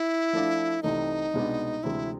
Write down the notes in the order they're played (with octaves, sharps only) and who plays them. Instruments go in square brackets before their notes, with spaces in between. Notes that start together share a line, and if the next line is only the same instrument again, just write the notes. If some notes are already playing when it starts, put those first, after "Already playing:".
Already playing: [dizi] E4
[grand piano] F3 A3 D4 F4
[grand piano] C2 C3 E3 A3 [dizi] D#4
[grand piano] C2 B2 G#3 B3 D4
[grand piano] D2 C3 E3 G#3 [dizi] E4